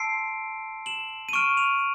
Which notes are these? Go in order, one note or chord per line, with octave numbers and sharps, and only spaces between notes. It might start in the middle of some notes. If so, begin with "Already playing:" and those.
Already playing: A5 C6 E6 C7 D7
E7 F#7
D#7
C#6 F6 D7 E7
D#7 F7